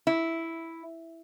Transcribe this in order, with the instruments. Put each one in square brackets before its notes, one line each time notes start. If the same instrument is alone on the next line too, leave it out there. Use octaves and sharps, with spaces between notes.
[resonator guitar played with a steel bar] E4